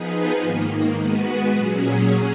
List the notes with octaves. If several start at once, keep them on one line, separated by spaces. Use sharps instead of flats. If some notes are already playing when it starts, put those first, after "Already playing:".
Already playing: F3 B3 D#4 G#4 B4
G#2 D#3 A#3
G#3 B3 F#4 B4
A#2 F#3 C#4 G#4